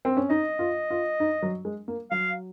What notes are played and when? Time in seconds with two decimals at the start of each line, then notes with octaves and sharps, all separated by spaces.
0.05 C4
0.17 C#4
0.30 D#4 D#5
0.59 F4
0.90 F4
1.20 D#4
1.42 F#3
1.65 G#3
1.88 A#3
2.11 F#3 F5